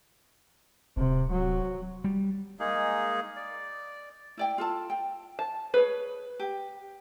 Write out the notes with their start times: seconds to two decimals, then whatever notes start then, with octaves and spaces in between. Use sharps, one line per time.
0.97 D1 C3
1.31 F#3
2.04 G3
2.60 G#3 A#3 D#4 G#4
3.37 D5
4.37 E4 D5 G5
4.58 F4 A4 A5
4.90 G5
5.39 A5
5.74 G#4 B4 C#5
6.40 G4